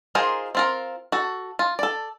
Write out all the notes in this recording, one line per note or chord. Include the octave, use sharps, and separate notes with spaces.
D#4 F4 G#4 A#4 C5
C4 F4 A#4
F#4 A4
F4
A4 D5